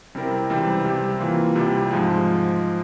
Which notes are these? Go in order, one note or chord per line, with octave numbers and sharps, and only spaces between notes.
C3 G3 C4 E4 A#4
C#2 C3 E3 G3 C4
C3 G3 C4 G4
E3 A#3 F4
C2 C3 G3
G#2 F3 G#3